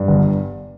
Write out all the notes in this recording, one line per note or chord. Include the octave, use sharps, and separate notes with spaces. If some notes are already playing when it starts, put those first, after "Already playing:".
Already playing: G2
G1